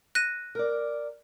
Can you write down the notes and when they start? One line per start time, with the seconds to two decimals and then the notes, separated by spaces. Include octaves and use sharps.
0.15 F#6 A#6 D#7
0.55 A#4 D5